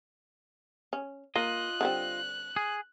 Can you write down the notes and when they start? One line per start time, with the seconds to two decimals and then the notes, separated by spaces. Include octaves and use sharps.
0.93 C#4
1.36 A#3 F4 D#5 F#6
1.81 D3 G3 C4
2.56 G#4